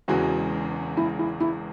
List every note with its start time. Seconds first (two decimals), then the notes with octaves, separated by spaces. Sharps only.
0.08 E1 E2 C#3 E3 G#3 F#4
0.97 E4
1.19 E4
1.40 E4